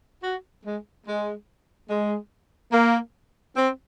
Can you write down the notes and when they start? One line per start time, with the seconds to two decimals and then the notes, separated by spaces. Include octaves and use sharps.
0.24 F#4
0.64 G#3
1.07 G#3
1.89 G#3
2.72 A#3
3.56 C4